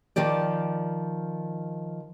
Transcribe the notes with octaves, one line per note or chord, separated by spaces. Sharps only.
D#3 F3 G4 D5